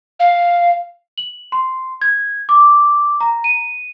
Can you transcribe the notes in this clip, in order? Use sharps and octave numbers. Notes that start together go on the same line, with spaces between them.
F5
F#7
C6
G#6
D6
A#5
D#7